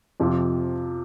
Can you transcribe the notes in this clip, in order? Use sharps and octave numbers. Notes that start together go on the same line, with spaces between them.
F2 C3 F3